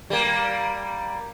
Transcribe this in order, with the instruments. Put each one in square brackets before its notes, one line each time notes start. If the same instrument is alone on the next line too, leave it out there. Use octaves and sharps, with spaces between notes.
[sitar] G3 A#3